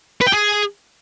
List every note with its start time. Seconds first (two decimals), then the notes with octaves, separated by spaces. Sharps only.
0.21 B4
0.27 G5
0.33 G#4